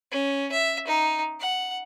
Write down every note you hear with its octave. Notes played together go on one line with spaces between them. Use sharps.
C#4
E5
D#4
F#5